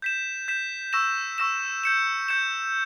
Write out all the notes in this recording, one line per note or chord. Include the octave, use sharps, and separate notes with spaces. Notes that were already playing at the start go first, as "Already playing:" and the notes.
G6 B6 E7
G6 B6 E7
C#6 E6 A#6 E7
C#6 E6 A#6 E7
G6 C#7 E7
G6 C#7 E7